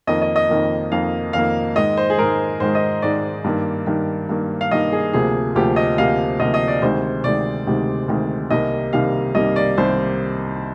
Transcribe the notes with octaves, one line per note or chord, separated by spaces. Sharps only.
F2 D#3 A#3 D#5
D#5
D#5
F2 D#3 A#3
F2 D#3 A#3 F5
F2 D#3 A#3 F5
G#2 D#3 G#3 D#5
C5
G#4
G#2 D#3 G#3 A#4
G#2 D#3 G#3 C5
D#5
G#2 D#3 G#3 D5
G2 D#3 A#3
G2 D#3 A#3
G2 D#3 A#3
F5
G2 D#3 A#3 D#5
G#4
D2 C3 F3 A#3 G#4
D2 C3 F3 A#3 G4
D#5
D2 C3 F3 A#3 F5
D2 C3 F3 A#3 D#5
D#5
D5
D2 C3 D#3 G#3 C5
D2 C3 D#3 G#3 D5
D2 C3 D#3 G#3
D2 C3 D#3 G#3
C2 C3 D#3 G3 A#3 D#5
C2 C3 D#3 G3 A#3 F5
C2 C3 D#3 G3 A#3 D#5
D5
C2 C3 D#3 G3 A#3 C5